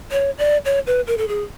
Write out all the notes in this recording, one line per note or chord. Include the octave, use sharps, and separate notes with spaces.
C#5
D5
C#5
B4
A#4
A4
G#4